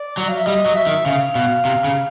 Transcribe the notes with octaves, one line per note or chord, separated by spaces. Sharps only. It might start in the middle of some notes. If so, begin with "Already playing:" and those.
Already playing: D5
F#3
F5
E5
G3 D#5
F#3
E5
D#3
C#3 F5
B2
C3
C#3